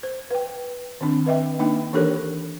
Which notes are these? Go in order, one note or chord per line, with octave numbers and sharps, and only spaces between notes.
C5
B4 G5
D#3 C4 D4
B4 D#5 E5 G5
A#3 D4 D#4 G5
E3 D4 G4 A4 A#4 C#5